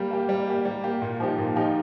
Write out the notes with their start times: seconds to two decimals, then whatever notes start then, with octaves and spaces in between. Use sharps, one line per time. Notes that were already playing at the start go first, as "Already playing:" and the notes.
Already playing: G3 A#3 G4
0.11 A#3 G4
0.29 G3
0.47 A#3 G4
0.65 G3
0.83 A#3 G4
1.02 A#2
1.20 F3 D#4 G4
1.38 A#2
1.56 F3 D#4 G4